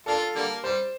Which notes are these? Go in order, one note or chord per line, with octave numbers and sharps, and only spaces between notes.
A#3 D4 F4 A4
D3 G3 A#3
G3 C5